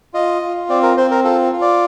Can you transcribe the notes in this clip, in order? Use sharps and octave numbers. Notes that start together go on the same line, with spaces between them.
F4 D#5
F4
C4 D5
A#4
C4 C5
A#4
F4 A4
F4
D5